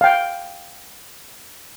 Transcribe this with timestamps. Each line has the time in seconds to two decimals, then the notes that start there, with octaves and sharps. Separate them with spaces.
0.01 F5 G5